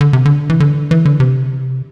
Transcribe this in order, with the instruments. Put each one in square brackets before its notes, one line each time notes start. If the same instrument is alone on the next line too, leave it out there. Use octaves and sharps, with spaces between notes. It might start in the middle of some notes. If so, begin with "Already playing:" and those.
[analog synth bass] D3
C3
D3
E3
D3
E3
D3
C3